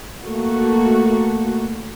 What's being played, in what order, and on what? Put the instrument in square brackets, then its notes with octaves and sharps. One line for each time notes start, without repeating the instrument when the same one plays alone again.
[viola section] A3 A#3 F#4